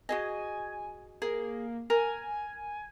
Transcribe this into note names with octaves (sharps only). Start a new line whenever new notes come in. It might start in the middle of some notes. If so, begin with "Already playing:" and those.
F#4 G#4 D#5 G#5
A#3 G#4
A#4 G#5